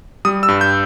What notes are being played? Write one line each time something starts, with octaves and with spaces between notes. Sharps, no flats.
G3 D#6
E6
G2
G6